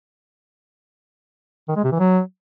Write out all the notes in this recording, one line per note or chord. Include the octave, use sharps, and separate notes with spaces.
D#3
G#3
C3
E3
F#3